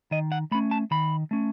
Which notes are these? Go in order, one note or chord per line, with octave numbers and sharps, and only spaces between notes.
D#3 D#5
F#5
A3 C#4 B5
A5
D#3 B5
A3 C#4